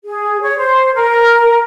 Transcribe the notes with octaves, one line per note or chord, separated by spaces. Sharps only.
G#4
C#5
C5
A#4